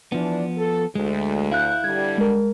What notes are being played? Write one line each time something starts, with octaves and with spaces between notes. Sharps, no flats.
E3 F3 B3 D4
A4
D2 G#3
E4 F5 F#6 G6
G2 D3 G3 G#6
G#3 A#4